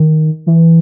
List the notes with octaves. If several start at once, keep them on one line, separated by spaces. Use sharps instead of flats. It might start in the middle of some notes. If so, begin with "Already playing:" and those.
Already playing: D#3
E3